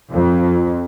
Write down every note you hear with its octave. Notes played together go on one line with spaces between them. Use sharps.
F2